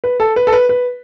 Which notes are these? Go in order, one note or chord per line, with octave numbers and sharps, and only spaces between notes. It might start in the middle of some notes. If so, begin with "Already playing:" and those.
B4
A4
B4
A4
B4
B4